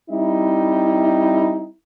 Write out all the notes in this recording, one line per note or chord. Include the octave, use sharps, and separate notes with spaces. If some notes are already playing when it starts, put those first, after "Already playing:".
G3 C4 D#4 E4